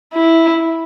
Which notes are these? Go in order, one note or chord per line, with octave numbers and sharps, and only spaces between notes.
E4